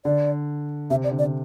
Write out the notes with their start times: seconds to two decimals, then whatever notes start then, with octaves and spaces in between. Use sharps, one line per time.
0.05 D3 D5
0.90 C3 E5
1.04 D5
1.11 D3
1.19 D5
1.24 D3